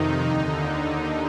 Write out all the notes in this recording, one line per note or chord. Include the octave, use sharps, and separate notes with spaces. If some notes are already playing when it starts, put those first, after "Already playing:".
Already playing: F2 C3 D#3 D#4
D#2 D3